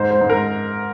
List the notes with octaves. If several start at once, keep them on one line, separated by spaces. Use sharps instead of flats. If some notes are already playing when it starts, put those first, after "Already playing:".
Already playing: G#2 C5
C5
G#2
A#4